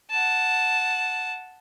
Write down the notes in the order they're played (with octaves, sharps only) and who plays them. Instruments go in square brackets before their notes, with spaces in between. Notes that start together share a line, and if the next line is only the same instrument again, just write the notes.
[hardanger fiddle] F#5 A5